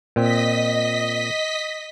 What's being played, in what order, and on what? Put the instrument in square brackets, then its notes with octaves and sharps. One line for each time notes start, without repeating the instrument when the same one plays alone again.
[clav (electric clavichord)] A#2 C4 [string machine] D#5 B6